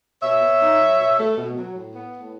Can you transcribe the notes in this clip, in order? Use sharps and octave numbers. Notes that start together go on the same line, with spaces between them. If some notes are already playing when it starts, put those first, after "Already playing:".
B2 C#5 E5
B3
D#4
F#3
B2
A3
B2
F#3
A2
B3
A2